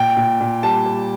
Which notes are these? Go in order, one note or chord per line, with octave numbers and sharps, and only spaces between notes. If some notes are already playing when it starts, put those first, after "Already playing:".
Already playing: A#2 G5
A#2
A#2
G3 A5
G3